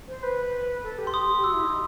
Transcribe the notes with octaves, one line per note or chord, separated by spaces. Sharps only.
C5
B4
A4
G4
C6
G4 D#6
G4
F#4 E6
E4
D#4